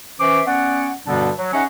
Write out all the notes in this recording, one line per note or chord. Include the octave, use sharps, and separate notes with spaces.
E3 C#4 C5 E5 D6
B3 C#4 D5 F#5
G2 B2 D3 G3 B3 D4
F#3
C#4 D#4 G#4 D#5 E5 F#5